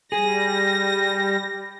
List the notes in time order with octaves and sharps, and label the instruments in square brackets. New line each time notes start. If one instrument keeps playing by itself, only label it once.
[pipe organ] G3 [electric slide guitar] G#4 [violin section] A#6